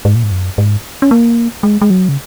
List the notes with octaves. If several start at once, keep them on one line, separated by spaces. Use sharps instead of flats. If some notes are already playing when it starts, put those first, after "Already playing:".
G#2
A#2
G#2
F#2
G#2
C#4
A#3
G#3
G#3
F#3
C#3